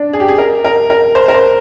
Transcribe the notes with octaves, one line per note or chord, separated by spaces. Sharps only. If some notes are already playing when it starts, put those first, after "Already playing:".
Already playing: D4
G#4
G4
G#4
A#4
A#4
A#4
C5
A#4
C5